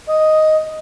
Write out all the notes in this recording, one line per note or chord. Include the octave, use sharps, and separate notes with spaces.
D#5